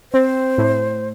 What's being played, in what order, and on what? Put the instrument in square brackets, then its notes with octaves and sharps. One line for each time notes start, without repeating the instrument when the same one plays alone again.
[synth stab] C4 [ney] C5
[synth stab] A2